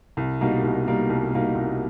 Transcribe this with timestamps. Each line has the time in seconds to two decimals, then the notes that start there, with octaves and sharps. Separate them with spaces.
0.17 C2
0.41 B2 G3 A#3 D#4
0.64 C2
0.86 B2 G3 A#3 D#4
1.09 C2
1.33 B2 G3 A#3 D#4
1.55 C2